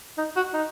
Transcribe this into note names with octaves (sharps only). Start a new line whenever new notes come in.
D#4
F#4
D#4